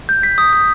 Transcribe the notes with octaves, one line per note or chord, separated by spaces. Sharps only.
G6
B6
D#6
D#6